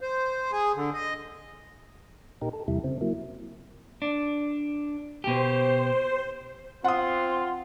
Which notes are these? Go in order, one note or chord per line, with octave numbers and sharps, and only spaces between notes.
C5
G#4
D3
D#5
A#2 D#4 G4 A#4
A4
E2 C3 G3 E4
C#3 C4
F#3 A#3 E4
D4
B2 G4 C5
C4 F4 F#5 C6 D#6